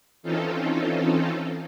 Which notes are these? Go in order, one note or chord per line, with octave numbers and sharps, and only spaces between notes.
E3 C4 C#4 D#4 F4 A4